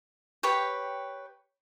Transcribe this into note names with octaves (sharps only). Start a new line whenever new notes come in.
G4 B4 C#5 G5